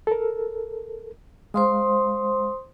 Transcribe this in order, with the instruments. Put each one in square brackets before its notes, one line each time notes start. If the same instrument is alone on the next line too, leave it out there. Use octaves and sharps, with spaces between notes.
[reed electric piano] A4 A#4
[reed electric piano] G#3 F5 [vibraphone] C5 C6 D#6